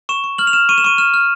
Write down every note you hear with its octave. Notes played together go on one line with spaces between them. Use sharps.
C#6 E7
C#6
F6 F#7
F7
F6 E7
C#6 D#7
E7
C#6 D#7
F6 E7
F6